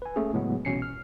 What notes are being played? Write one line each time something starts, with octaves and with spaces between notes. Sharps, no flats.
B4 G#5
A3 A#3 C#4 G#4
A2 C#3 F#3 G#3 B3
C2 B2 E3 C#4 C7 C#7
F6